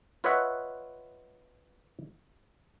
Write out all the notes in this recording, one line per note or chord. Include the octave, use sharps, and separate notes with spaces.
F4 B4 C#5 D#5 E5 F#5